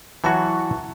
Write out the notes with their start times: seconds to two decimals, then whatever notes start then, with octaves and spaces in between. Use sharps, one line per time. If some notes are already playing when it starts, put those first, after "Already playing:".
0.24 E3 F#3 E4 F#4 A5 C#6